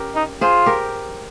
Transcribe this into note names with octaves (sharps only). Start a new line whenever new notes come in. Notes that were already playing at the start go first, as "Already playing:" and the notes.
Already playing: C#4 G4 A#4
D#4
F4 G#4 C5
G4 A#4